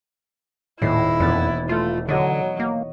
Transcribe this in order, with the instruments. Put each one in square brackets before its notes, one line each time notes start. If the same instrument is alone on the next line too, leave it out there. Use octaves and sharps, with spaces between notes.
[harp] D#1 A#6 C7 [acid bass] A2 [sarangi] E4
[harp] E1 B3 A6 [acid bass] F2
[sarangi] A3 [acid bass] F4
[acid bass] D3 [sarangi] F#3 [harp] C#5 D#5
[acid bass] A#3